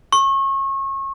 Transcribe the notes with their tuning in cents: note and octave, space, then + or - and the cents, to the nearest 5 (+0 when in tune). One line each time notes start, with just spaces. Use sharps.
C#6 -30